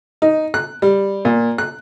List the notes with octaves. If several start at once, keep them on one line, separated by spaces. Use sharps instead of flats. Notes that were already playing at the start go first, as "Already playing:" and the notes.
D#4
F#6
G3
A#2
F#6